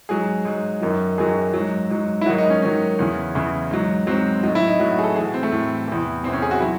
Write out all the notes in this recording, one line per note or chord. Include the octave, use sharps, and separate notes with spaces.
G#2 F#3 G#4
G#2 F#3
F#2 D#3 F#3
F#2 D#3 F#3 G#4
G#2 F#3
G#2 F#3
E4
G#2 D#3 F#3 F#4
D#4
C#4
G#2 D#3 F#3 C#4
E2 C#3 E3
E2 C#3 E3
G#2 F#3
G#2 F#3 C4
A2 F#3 D#4
E4
D#4
A2 F#3
F#4
G#4
A4
A2 E3 G#4
F#4
C4
A3
A2 E3
E2 C3 E3
E2 C3 E3 C4
C#4
G#4
F#4
F#3 E4